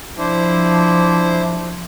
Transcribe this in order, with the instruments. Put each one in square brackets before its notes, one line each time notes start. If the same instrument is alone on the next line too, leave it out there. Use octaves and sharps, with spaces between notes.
[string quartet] F3 [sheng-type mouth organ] D4 E4 C5